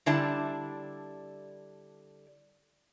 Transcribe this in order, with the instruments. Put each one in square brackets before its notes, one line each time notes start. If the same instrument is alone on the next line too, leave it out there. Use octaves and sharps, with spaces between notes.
[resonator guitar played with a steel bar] D3 G3 D4 E4 A5